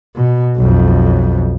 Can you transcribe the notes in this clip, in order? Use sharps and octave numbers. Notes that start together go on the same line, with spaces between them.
B2
B1 F2